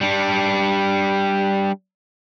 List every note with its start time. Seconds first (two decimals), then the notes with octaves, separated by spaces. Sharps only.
0.01 G3 D4